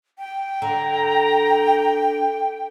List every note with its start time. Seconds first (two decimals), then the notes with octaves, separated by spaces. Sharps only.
0.19 G5
0.62 D3 A#5